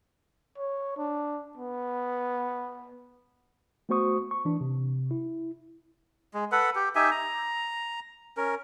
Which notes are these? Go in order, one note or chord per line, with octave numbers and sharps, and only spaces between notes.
C#5
D4
B3
A3 B3 F#4 C5 C#6 D#6
C#6
E3 D4
C3
E4
G#3
A4 B4 F#5
G4
D#4 G4 E5 G#5
A#5
C#4 A#4